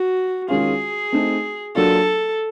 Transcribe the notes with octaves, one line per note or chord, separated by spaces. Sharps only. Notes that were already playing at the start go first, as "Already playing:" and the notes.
Already playing: F#4
D#3 G#3 C#4 F4 G#4
A3 C4 D#4
F#3 A#3 D4 F4 A4